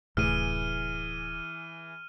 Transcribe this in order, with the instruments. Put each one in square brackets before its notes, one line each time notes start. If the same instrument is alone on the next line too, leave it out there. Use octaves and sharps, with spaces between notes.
[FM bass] D1 [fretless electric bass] A2 C3 A3 [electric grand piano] E3 G#4 [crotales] F6 D#7